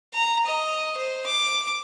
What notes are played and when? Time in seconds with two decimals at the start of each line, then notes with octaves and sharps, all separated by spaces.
0.14 A#5
0.46 D#5
0.98 C5
1.26 D6